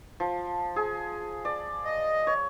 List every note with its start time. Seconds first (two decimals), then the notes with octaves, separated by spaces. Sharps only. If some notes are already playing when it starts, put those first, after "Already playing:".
0.20 F3
0.76 G#4
1.45 D5
1.85 D#5
2.27 C#5